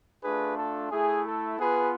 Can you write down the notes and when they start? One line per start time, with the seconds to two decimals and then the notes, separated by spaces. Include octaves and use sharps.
0.23 A3 D4 F4 G#4 B4
0.57 A4
0.91 A3 E4 G#4
1.25 A4
1.59 B3 F4 G#4 B4